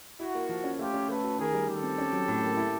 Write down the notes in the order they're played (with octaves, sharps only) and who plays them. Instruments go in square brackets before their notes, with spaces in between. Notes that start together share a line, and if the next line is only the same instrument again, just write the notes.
[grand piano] E4 [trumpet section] F#4
[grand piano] A#3
F3
C#4
[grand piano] A3 [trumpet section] F4 G4
[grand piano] C#4
[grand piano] A3 [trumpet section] A4 B4
[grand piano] F#4
[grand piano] D#3 [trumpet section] G#4 A#4
[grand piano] G3
[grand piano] D#3 [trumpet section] G4 A4
[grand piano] C4
C#4
F#3
A2
A#3
E4